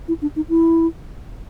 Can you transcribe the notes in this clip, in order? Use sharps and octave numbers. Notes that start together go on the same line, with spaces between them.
E4
D4
D#4
E4